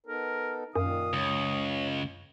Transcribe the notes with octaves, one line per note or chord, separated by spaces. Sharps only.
B3 D#4 A4 A#4
F#2 A#2 D#3 F5 D#6
C#2 C#5